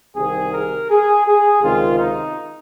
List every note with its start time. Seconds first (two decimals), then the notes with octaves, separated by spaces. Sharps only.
0.16 C2 C3 D#3 G#4
0.53 A#4
0.90 G#4
1.26 G#4
1.62 C#2 C3 D#3 F4
1.99 D#4